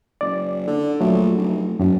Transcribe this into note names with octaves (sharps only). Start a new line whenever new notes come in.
F#1 D5
D3
A#1 F#3 A3
F1
F#1 F#2